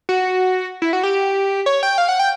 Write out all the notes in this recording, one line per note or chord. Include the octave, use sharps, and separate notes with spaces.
F#4
E4
F#4
G4
C#5
G5
F5
F#5
G5